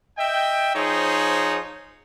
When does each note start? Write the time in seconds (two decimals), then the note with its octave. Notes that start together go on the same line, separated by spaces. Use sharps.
0.18 D#5 E5 G5
0.75 F3 D#4 G#4 C5 C#5